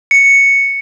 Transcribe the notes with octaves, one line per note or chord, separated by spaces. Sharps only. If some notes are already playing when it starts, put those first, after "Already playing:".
C#7